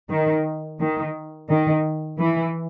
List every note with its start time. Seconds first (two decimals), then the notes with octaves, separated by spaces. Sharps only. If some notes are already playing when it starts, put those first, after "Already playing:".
0.10 D#3
0.80 D#3
1.50 D#3
2.19 E3